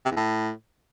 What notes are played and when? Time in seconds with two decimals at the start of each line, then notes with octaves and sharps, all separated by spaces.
0.05 C3
0.11 E2
0.16 A2